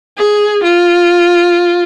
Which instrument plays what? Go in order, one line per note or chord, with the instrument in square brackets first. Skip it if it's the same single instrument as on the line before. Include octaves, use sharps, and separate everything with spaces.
[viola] G#4
F4